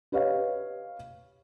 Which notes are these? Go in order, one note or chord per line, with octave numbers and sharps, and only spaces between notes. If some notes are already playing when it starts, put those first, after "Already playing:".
G4 B4 C#5 D#5 F5